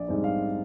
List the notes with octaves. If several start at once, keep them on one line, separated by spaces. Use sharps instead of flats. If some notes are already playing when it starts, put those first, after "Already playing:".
Already playing: A#1 D5
G#2 G3 C4 D#4
F5